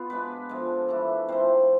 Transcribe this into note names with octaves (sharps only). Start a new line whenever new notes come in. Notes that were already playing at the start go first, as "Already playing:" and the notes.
Already playing: B3 F4
B2 G#3 D4 B4
D3 F3 G#3
E3 A3 D4
C3 F3 A3 C5